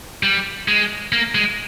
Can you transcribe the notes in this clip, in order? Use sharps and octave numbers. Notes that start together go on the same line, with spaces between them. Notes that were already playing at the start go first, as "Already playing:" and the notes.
G3
G#3
A#3
G#3